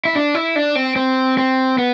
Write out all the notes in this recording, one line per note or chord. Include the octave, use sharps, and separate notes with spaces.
E4
D4
E4
D4
C4
C4
C4
B3